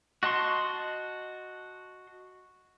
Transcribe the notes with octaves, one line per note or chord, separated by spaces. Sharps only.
F#4 D#5 A5 C6 C#6